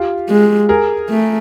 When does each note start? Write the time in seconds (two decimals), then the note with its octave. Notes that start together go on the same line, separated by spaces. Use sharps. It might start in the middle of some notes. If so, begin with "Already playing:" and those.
Already playing: F4 G4
0.30 G#3
0.69 G#4 A#4
1.10 A3